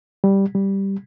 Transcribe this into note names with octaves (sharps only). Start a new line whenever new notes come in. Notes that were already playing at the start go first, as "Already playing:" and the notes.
G3
G3